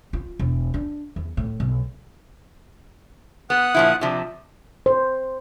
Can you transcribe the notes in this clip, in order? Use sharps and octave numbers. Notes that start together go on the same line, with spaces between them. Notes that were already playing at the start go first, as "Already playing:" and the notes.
F4
E1
D4
E2
A2
B1
B3 F#5 D#6 F#6
A#2 F3 E4
C3 F3 D4
C5